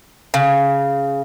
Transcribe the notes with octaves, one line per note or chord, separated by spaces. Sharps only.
C#3